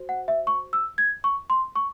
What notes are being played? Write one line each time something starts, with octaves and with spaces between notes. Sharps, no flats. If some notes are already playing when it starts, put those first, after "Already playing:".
Already playing: F#4 C5
F#5
E5
C#6
E6
G#6
C#6
C6
C#6